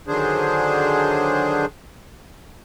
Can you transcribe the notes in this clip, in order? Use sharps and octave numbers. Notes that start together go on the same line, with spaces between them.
D3 D#3 F#3 D4 G#4 C5